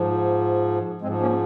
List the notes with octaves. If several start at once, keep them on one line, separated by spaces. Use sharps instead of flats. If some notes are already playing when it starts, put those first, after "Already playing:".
Already playing: G#2 F3
G#2 F3 G#3 C4
A#3 C#4